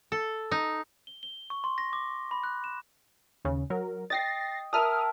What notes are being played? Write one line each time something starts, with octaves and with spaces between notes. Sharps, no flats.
A4
D#4
G7
G7
C#6
C6
A#6
D6
B5
F#6
E7
D#2 C#3
F#3 A#4
D#5 G5 A6 A#6 C7
A#4 E5 A5 D#6 F6